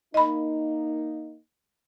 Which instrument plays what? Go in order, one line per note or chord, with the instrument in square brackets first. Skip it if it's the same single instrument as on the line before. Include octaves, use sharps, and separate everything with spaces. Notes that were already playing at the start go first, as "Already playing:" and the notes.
[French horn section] A#3 D#4 [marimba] D#5 B5